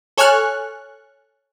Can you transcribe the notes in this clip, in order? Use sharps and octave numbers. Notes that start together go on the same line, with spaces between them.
A4 C#5 G#5 C#6 F6 F#6